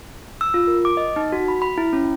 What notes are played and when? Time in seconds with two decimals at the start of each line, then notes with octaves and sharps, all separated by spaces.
0.41 E6
0.54 F4
0.67 A#4
0.85 D6
0.97 D#5
1.16 D#4
1.32 F#4
1.48 B5
1.62 B5
1.78 E4
1.93 C#4